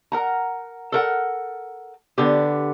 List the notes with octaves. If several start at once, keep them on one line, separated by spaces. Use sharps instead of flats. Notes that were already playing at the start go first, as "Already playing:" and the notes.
A#4 F#5 A#5
A4 A#4 F#5
D3 B3 G4